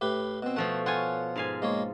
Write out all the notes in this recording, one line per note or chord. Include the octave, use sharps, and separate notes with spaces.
A2 G4 B4
B2 C4
B2 F3 A3 F#5
F4 C#5 F#5 G#5
G#2 F5 G#5
G#3 A#3 C#5